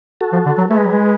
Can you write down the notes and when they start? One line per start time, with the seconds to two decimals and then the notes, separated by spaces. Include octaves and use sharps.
0.21 F#4 A4
0.33 F3
0.46 D3
0.58 F#3
0.70 A3 G#4 B4
0.77 G#3
0.85 F#3
0.93 G#3